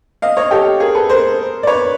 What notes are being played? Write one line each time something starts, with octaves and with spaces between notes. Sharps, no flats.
D#5 F5
C#5 D#5
G4 A4
G#4 A#4
A4 B4
A#4 C5
D5
B4 C#5